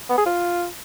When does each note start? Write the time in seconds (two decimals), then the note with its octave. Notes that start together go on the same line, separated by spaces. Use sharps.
0.09 B3
0.17 G#4
0.26 F4